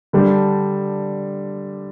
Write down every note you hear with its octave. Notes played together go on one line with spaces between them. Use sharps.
D3 G3 D4